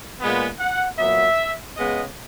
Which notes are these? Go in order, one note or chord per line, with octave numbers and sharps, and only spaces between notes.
A#2 G#3 B3
F#5
A#2 F#3 B3 E5
C#3 G#3 B3 D#5